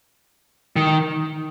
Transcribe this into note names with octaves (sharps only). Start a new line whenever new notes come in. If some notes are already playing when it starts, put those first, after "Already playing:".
D#3